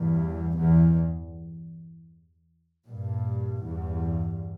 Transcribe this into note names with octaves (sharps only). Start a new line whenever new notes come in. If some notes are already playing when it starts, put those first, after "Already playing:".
Already playing: E2 G2
E2
G2 A#2
E2 G2